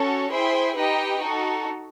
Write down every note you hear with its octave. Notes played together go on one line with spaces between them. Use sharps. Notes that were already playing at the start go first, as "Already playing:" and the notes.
Already playing: C#4 F#4 A4 C#5
E4 G#4 C5 E5 G5
D#4 G4 B4 D#5 G5
D#4 F#4 A4